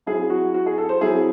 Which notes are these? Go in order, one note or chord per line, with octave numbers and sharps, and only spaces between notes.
F#3 C4 E4 G#4
F#4
F#4
G#4
A4
C5
F#3 C4 E4 G#4